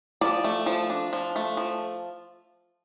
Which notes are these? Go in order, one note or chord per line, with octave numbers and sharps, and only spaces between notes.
F3 D5
A3
F3
D4
F3
A3
F3